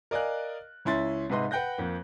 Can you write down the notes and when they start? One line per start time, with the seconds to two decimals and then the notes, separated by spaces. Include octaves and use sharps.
0.11 A#4 D5 D#5 F5 G#5 F#6
0.85 C#2 C#4 E4 C6 A6
1.30 G#2 C3 B4 D#5 C6
1.51 B4 F#5 G5 F#6 G6 A#6
1.78 F2 A#3